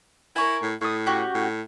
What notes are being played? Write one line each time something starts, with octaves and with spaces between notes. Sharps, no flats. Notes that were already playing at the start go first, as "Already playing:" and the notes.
E4 A#4 C#5 G#5
A2
A2 A3 D#6
C#4 F#4 G4
A2